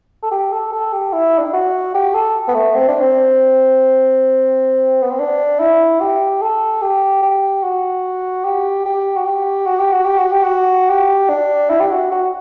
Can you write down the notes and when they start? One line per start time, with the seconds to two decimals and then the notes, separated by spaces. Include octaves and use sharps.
0.23 A4
0.31 G4
0.52 A4
0.72 A4
0.93 G4
1.13 E4
1.38 D4
1.46 E4
1.54 F#4
1.94 G4
2.14 A4
2.48 B3
2.55 A3
2.75 C4
2.88 D4
3.01 C4
5.02 B3
5.11 C4
5.20 D4
5.60 E4
6.00 G4
6.42 A4
6.82 G4
7.22 G4
7.63 F#4
8.45 G4
8.85 G4
9.17 F#4
9.26 G4
9.66 F#4
9.79 G4
9.93 F#4
10.05 G4
10.18 F#4
10.32 G4
10.44 F#4
10.89 G4
11.29 D4
11.70 E4
11.80 G4
11.91 F#4
12.11 F#4